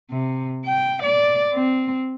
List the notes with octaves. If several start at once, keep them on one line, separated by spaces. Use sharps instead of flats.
C3
G5
D5
C4